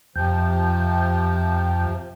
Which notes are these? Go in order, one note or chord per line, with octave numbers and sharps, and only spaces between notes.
F2 C3 F3 G5